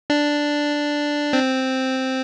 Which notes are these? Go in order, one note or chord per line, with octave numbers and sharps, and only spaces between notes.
D4
C4